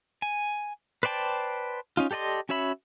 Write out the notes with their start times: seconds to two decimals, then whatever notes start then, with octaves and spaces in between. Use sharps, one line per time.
0.22 G#5
1.03 B4 C5 D5 G5 A5
1.97 C#4 D#4 F4
2.11 G4 A4 D5 D#5 C6
2.49 C#4 F#4 C#5 E5 B5